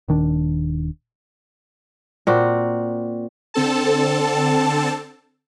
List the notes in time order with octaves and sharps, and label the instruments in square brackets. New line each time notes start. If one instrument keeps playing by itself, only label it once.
[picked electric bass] D#1 D#3 D4
[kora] A#2 C4 F#4
[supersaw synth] D3 C4 A4 A5